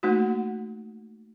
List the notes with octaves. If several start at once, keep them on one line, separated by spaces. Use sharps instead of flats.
A3 A#3 D#4 F#4